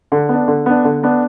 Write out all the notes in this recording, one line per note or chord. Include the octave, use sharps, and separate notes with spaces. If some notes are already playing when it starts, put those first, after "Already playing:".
D3
B3 D4
D3
B3 D4
D3
B3 D4